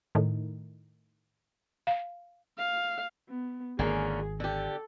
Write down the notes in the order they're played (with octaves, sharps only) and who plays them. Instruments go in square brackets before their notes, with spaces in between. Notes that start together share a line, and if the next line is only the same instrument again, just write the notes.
[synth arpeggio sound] A2 D#3
[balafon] F5
[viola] F5
[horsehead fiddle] B3
[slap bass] G#1 [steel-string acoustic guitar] D3 A#3 C#4 [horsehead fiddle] G#4
[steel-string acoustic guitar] D3 G4 [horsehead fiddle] A4